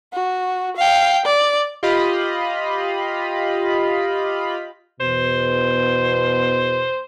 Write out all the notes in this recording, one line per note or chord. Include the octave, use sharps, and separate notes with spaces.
F#4
F5 G5
D5
F4 G4 D#5 F5 B5
E2 B2 C5